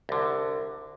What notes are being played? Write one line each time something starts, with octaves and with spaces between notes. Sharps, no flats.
C2 D3